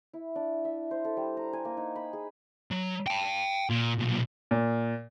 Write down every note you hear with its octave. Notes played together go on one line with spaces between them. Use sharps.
E4
D4
E5
C5
A4
G3
A#5
G#5
A#3
D#4
B5
G#4
F#3
G5 A5
A#2
B1 A#2
A#2